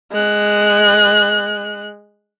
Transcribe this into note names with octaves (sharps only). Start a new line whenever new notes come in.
G#3 F#6